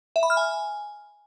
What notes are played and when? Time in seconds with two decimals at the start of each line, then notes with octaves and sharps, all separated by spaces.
0.16 E5
0.23 B5
0.30 F6
0.37 G#5